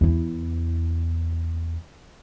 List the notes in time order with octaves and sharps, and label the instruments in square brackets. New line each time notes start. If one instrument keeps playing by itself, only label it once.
[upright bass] E2 E4